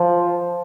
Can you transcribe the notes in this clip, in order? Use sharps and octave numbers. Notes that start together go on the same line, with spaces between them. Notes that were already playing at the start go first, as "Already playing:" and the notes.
Already playing: F3